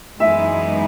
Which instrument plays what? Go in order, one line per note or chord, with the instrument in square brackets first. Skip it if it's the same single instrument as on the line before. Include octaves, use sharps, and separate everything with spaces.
[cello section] F#2 E3 G#3 B3 D#4 [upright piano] E5